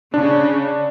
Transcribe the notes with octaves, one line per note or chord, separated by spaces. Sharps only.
C#3 D4